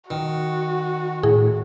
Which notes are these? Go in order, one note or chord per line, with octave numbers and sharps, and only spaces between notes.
D#3 F#4
A2 G#4